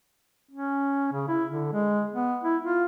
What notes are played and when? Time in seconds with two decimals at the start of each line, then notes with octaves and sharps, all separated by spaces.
0.51 C#4
1.12 C#3
1.28 E4
1.51 D3
1.73 G#3
2.13 B3
2.44 E4
2.63 F4